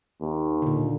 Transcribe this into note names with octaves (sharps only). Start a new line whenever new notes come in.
D#2
A#2 D3